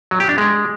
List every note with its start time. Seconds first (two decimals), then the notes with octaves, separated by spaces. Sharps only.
0.11 F#3
0.20 G4
0.29 D4
0.38 G#3